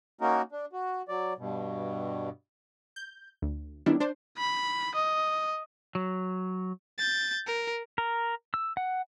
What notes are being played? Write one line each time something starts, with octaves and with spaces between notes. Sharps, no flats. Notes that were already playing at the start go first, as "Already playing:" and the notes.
A#3 C#4 D#4 F#4 A#4
D4
F#4
F#3 D5
G2 B2
G6
D2
D#3 G3 B3 C#4 D4 E4
D4 C5
B5
D#5
F#3
G6 A6
A#4
A#4
E6
F#5